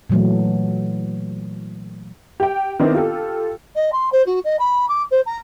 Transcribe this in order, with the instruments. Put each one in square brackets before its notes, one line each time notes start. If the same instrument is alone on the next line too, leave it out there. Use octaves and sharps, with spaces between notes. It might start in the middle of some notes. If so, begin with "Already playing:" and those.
[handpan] A#2 E3 F#3 A3
[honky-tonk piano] G4 G5
D#3 B3 C4 D4 E4
F4 G4 A4
[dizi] D#5
C6
C5
F#4
D#5
B5
D6
C5
A#5